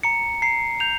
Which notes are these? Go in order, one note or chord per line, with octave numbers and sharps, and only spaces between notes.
A#5 C#7
A#5 C7
G6 F7